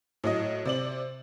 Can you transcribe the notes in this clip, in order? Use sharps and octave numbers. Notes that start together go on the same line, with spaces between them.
A2 F#3 D#5
C3 D5 F#7